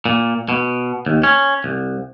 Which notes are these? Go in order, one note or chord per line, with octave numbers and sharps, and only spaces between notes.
A#2
B2
D#2
C#4
C2